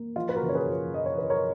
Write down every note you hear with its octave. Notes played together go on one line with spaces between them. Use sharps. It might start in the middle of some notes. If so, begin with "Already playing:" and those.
Already playing: A#3
F3 F4
B4
F#4 A#4
C#3
C#5
G#4 B4
F3
F3 D#5
C#5
F3 B4
A#4 C#5